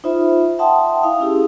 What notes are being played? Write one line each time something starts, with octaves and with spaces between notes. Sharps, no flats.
D#4 F4 C5 E5 B5
E5 F#5 G5 A5 C6 D#6
E4 F5 D#6
C#4 E4 G4 G#4